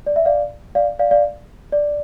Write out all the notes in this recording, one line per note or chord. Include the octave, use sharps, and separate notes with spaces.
D5
E5
D5 F5
D5 F5
D5 F5
D5 F5
D5